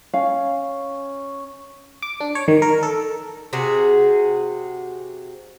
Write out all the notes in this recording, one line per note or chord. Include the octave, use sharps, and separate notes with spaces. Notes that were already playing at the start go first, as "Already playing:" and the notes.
C#4 F5
D6
D4
C#5
D#3
A#4
A4
C3 F#4 G#4